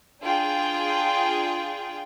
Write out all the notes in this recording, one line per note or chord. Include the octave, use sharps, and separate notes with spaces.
D4 F4 G#4 G5